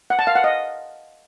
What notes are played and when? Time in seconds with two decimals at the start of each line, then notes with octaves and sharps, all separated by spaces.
0.10 F#5
0.19 A5
0.27 F5
0.36 F#5
0.44 D#5